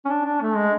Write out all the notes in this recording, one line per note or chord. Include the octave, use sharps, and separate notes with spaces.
C#4
D4
D4
A3
G#3